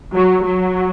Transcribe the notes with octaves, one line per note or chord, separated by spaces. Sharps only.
F#3
F#3